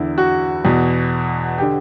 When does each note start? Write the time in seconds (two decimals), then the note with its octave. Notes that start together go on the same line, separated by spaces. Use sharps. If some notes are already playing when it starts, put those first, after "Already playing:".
Already playing: E2 D3 E4
0.18 F#4
0.65 E2 B2
1.58 D3 G4